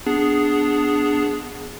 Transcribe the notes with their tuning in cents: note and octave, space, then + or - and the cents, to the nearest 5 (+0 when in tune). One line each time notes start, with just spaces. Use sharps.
B3 +5 D4 +0 G#4 +0